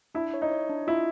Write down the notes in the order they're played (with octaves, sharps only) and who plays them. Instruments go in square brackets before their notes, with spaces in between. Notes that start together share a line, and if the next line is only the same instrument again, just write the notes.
[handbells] D4 [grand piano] E4
[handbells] C#5
[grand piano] D#4
[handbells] C#5
D4
[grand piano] E4 [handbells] F4